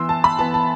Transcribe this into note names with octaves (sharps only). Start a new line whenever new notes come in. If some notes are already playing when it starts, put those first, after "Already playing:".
Already playing: E3 B3 C6 E6
A5
B5
E3 B3 A5
A5